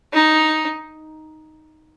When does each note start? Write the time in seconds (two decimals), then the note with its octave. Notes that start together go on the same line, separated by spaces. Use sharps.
0.13 D#4